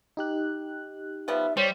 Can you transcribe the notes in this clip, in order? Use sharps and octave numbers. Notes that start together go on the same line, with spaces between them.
D#4 G4 F#6
F3 G3 B3 E5
G3 C5 C#5